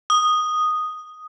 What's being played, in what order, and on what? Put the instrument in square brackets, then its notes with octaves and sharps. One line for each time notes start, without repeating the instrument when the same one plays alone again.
[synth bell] D#6